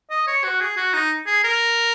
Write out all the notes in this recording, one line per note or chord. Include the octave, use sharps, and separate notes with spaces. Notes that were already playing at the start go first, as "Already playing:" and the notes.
D#5
C#5
F#4
G#4
F#4
D#4
G#4
A#4